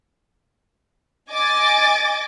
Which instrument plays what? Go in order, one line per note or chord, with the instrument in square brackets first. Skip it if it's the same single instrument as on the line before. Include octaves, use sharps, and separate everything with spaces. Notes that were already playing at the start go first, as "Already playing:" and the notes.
[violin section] D#5 G#5 D6 A6